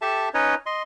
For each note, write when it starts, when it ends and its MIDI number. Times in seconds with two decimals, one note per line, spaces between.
0.02 0.29 67
0.02 0.29 69
0.02 0.29 76
0.02 0.29 81
0.34 0.55 61
0.34 0.55 63
0.34 0.55 71
0.34 0.55 73
0.34 0.55 75
0.66 0.82 75
0.66 0.82 84